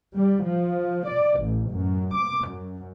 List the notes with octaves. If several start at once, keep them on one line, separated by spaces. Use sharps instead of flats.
G3
F3
D5
A1
F#2
D6
F#2